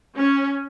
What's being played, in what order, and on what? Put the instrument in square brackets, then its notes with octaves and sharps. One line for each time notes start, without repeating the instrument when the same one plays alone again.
[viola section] C#4